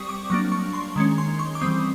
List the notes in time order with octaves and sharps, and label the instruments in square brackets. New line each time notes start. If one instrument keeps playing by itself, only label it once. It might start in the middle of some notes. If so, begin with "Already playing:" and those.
Already playing: [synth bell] G3 C4 C#6 D#6
D6
F#3 A#3 D4 C#6
C#6
C6
D#3 G#3 C#4
C6
C#6
D6
E3 G3 C4 D#6